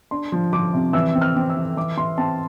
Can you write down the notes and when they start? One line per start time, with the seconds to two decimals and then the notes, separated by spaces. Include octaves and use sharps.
0.11 D4 C6
0.32 F3
0.53 F3 D6
0.74 C3
0.93 E3 E6
1.15 C4
1.21 F6
1.36 C4
1.50 E6
1.57 E3
1.77 E3 D6
1.97 E3 C6
2.18 C4 A5